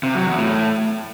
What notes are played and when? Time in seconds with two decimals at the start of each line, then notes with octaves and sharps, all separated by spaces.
0.03 C3
0.15 F#3
0.26 E2
0.38 A2